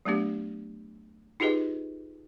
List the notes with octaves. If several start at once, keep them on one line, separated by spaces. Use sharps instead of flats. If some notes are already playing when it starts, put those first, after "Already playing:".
F#3 A3 B3 D4 G4
D#4 F4 G4 G#4 B4 D#5